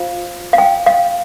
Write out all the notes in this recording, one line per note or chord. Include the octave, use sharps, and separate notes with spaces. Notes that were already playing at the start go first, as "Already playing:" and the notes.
Already playing: F4 C5 F5
F5
G5
F5